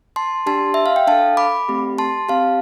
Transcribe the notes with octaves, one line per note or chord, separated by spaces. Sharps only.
A5 C6
D4 G4 A5 C6
E5
F5
G5
D4 A4 F5 A5
B5 D6
A3 C4 G4
A5 C6
C4 G4 F5 A5